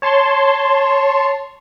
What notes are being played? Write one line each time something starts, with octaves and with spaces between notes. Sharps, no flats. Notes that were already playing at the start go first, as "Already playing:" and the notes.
C#5 A5 C6